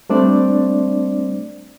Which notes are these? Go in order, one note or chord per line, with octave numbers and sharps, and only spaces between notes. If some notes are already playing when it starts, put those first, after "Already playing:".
G3 A3 C4 D4 C5 D5